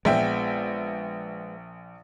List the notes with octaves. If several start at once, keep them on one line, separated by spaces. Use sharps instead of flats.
A#1 G#3 B3 E5 G5